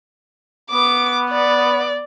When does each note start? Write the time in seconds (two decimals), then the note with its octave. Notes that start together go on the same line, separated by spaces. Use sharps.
0.71 B3 D6
1.31 D5